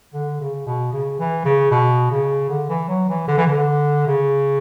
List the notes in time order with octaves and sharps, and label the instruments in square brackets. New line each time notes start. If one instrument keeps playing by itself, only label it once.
[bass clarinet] D3
C#3
B2
C#3
E3
C#3
B2
C#3
D3
E3
F#3
E3
D3
E3
D3
C#3